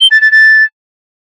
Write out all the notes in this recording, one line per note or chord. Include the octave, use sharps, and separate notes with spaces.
G7
A6
A6
A6